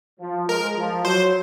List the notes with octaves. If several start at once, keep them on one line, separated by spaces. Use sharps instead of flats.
F3
G#3 A#4
F3
F#3 C5